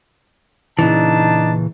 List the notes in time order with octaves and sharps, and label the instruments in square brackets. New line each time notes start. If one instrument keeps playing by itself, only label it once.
[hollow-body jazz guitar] A#2 C#3 E3 [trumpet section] D4 D#4 A5